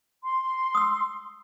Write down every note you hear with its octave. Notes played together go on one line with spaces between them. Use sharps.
C6
D#6 E6